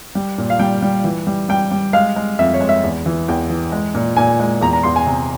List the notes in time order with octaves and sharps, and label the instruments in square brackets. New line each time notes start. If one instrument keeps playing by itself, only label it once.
[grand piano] G3
A#2
F5
G3 G5
G3
E3
G3
G3 G5
G3
G#3 F5
G#3
F2 E5
C#5
G#3
E5
E2
E3
E2 G5
E3
G#3
A#2
A#2 G#5
G#3
E2 A#5
A#5
E2 C6
G#5
C3